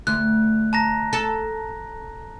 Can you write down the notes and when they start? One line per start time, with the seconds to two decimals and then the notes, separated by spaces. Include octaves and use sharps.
0.07 D2 F#6
0.73 A5 A#5 A#6
1.13 A4